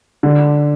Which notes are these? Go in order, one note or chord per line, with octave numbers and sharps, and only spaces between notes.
D3